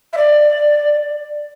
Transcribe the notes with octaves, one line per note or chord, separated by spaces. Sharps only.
E5
D5